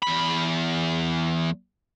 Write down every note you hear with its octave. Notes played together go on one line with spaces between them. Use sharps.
E2 B5